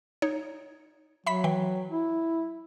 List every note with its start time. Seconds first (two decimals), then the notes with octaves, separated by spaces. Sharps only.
0.22 D#4 C#5
1.27 F#3 E5 B5 B6
1.44 E3 G5
1.91 E4